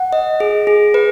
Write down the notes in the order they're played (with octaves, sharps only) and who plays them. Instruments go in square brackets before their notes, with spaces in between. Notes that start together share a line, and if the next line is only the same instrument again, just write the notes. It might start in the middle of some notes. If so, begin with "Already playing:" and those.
Already playing: [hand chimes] F#5
D#5
G#4
G#4
B4